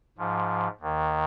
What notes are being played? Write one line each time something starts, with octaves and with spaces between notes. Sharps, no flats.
G#2 F3
D#2 D#3